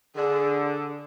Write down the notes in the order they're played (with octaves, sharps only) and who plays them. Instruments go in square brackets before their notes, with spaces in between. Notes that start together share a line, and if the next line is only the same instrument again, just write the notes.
[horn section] D3 [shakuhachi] G#4